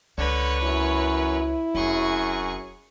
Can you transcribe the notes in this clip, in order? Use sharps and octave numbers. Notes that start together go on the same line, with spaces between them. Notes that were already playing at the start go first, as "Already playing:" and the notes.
C#2 D3 B4 C#5
F#2 E4
F1 F#2 G#4 C#6